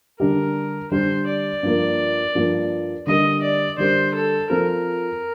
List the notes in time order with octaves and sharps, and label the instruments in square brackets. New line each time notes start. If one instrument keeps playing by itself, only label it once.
[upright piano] D3 G3 D4 G4 [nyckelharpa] A#4
[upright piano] D3 G3 D4 G4 [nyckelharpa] C5
[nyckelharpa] D5
[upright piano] G2 F3 A#3
G2 F3 A#3
[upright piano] D3 G3 D4 G4 A#4 [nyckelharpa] D#5
[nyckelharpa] D5
[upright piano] D3 G3 D4 G4 A#4 [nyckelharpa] C5
[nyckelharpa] A4
[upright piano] F3 C4 F4 A4 C5 [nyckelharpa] A#4